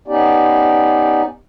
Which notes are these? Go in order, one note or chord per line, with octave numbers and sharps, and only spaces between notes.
B3 C#4 D#4 G4 D5